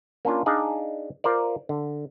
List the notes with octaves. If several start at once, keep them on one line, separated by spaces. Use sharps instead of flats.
A#3 C#4 D4 F4
D4 D#4 G#4 D5 F5
F4 A#4 C5 D5
D3